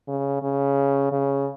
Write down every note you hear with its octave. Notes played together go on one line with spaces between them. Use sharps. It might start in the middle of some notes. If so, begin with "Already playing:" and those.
C#3
C#3
C#3